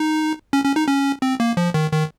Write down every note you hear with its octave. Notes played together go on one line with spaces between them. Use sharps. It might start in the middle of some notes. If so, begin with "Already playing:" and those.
Already playing: D#4
C#4
C#4
D#4
C#4
C4
A#3
F3
D#3
D#3